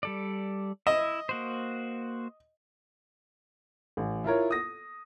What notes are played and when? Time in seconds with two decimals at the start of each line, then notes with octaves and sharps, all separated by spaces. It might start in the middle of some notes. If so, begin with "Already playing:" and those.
0.03 G3 A4 D5
0.87 E4 D#5 E5
1.29 A#3 F#4 C5
3.97 A1
4.24 E4 F4 A#4 C#5
4.51 D#6 A#6